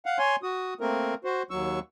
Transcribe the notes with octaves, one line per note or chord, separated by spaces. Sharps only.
F5 F#5
C#5 G#5 C6
F#4 D#6
A3 A#3 C4 A#4
F#4 C5
D#2 F#3 C#6 E6